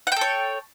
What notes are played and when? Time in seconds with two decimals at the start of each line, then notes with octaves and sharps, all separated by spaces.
0.07 F#5
0.12 G5
0.16 A4
0.21 C#5